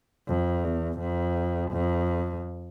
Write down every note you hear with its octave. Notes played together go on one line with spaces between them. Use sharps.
F2
E2
F2
F2